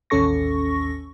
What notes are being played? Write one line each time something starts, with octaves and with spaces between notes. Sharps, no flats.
A1 D#2 C#4 A4 C#6 A#6